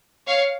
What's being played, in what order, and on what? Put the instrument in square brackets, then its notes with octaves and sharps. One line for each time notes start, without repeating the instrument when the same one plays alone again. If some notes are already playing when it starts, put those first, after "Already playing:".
[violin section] C#5 F5